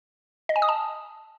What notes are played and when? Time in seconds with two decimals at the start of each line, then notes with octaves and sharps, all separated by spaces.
0.49 D#5
0.56 G#5
0.62 D#6
0.69 A5